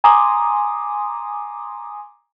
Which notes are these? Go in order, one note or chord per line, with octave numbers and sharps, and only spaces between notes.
G#5 A#5 C6 D6 D#6